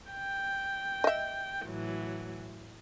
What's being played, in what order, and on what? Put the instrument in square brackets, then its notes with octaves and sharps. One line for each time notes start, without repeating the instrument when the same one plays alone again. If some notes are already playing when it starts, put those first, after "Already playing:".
[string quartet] G5
[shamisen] D#5 E5
[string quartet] A2 E3 F#3